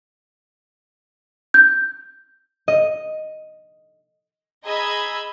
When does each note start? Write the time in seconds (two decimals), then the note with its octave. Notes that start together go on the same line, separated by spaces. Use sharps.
1.54 G6
2.68 D#5
4.65 G#4 D#5 A#5 B5 E6 G#6